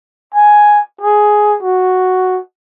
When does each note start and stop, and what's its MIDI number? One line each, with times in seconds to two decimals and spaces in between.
0.34 0.80 80
1.01 1.56 68
1.62 2.39 66